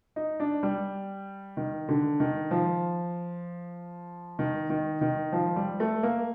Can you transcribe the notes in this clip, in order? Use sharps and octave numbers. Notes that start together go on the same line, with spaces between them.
D#4
D4
G3
D#3
D3
D#3
F3
D#3
D#3
D#3
F3
G3
A3
A#3